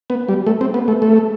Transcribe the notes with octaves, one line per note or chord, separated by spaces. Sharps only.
B3
G3
A3
C4
B3
A3
A3